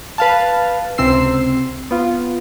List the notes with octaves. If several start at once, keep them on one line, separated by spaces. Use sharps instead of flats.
B4 F5 A5
C#2 C3 C4 E6 C7
B3 F4